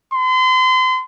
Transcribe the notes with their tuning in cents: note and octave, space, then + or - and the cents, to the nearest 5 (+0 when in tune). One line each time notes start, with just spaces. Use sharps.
C6 -35